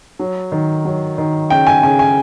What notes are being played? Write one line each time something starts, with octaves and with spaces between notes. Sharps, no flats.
F#3
D#3
F#3
D#3
C#3 G5
G#5
C#3 G#5
G#5